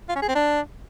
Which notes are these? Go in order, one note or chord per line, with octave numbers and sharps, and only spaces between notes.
F4
C#4
G#4
C4
D4